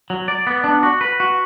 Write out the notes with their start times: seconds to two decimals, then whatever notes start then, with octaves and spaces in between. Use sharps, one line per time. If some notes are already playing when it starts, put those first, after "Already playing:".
0.10 F#3
0.28 D5
0.47 B3
0.64 D4
0.83 F#4
1.01 B4
1.20 F#4